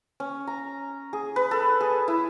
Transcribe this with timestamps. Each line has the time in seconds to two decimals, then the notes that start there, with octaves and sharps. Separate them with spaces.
0.20 C#4
0.47 A#5
1.13 G#4
1.36 B4
1.51 A4
1.81 G#4
2.08 E4